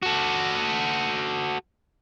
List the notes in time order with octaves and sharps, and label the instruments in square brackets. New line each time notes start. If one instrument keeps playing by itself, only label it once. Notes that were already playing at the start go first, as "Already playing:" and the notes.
[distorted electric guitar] F#4 A4